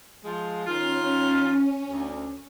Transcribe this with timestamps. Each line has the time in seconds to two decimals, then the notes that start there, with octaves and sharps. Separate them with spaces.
0.23 F3 G#3
0.66 D#3 C#4 F4
1.89 D2